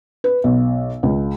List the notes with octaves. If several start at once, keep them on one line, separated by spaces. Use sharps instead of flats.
B4
B1
C#2